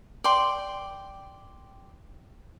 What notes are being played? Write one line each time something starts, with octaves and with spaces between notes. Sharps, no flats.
D5 G5 C6